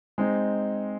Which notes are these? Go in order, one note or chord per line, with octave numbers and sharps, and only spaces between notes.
G#3 C4 D#4